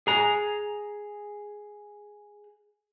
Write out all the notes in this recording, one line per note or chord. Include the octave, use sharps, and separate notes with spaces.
G#4 A#5